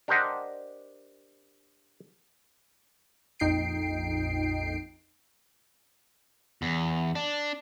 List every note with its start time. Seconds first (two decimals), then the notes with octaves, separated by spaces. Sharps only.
0.08 D4 G4 A#4 C5 D#5 F#5
3.40 A#1 F2 D#4 G5 C7 D7
6.62 E2
7.15 D4